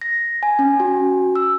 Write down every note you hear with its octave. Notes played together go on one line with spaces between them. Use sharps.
A#6
G#5
C#4
F#4
E6